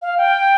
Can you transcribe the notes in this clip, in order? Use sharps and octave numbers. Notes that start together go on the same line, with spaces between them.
F5
G5